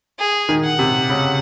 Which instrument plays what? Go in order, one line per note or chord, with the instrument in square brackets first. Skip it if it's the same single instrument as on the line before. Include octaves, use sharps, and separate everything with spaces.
[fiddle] G#4
[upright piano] D#3
[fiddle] F#5
[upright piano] C3
C#3